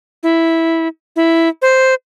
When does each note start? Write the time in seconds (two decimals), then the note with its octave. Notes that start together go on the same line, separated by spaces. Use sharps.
0.23 E4
1.16 E4
1.62 C5